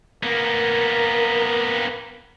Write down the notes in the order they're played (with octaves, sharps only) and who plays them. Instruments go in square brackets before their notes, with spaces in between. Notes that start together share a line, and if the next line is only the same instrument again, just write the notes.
[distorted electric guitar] A#3 B3 [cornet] A#4